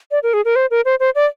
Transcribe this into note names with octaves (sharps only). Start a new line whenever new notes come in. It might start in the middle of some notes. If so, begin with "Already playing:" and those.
D5
A#4
G#4
A#4
C5
A#4
C5
C5
D5